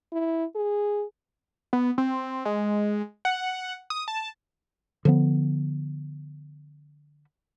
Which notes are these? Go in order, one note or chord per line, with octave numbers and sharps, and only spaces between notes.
E4
G#4
B3
C4
G#3
F#5
D#6
A5
D3 F3 B3